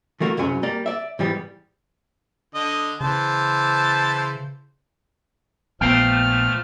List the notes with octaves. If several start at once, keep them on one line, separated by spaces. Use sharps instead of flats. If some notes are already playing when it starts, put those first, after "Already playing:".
E3 A3 A#3 F#4 A#4
C2 F#2 C#3 F#3 G#5
G3 A#3 D5 A#5
D5 E5
G#2 E3 G3 B3
D3 D#5
C#3 E3 C5 A5
A#1 A#2 F3 A3 B3 F5 G5 F6